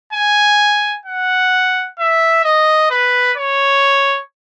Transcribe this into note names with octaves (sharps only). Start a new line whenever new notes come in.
G#5
F#5
E5
D#5
B4
C#5